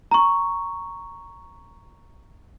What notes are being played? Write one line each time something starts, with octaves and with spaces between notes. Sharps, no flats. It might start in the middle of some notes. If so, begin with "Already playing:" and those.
A#5 C#6